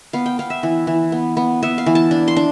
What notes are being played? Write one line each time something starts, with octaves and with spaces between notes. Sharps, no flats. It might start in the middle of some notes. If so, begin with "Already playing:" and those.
B3 F5
G5
B3 F5
E5
E3
E3
B3
B3
B3 E5
F5
E3
A5
D4
C6
D4